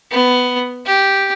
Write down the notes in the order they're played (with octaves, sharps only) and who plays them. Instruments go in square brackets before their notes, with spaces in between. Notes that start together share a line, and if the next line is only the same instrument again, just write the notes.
[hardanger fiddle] B3
G4